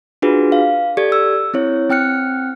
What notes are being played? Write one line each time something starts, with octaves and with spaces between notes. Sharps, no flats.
D4 F4 F#4 G#4 B4
F5
G4 A4 D5 G#6
E6
C4 E4 C#5
C4 G5 F6 F#6 C#7